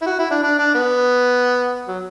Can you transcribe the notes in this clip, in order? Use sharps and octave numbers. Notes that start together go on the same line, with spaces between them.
E4
F#4
E4
D4
D4
D4
B3
F#3